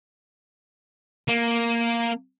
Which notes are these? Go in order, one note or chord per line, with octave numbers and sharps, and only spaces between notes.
A#3